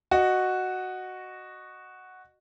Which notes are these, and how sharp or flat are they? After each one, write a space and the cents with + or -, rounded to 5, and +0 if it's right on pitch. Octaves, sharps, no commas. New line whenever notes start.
F#4 +0 D#5 -20